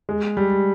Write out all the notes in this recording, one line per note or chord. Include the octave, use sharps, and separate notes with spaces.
G#3
G3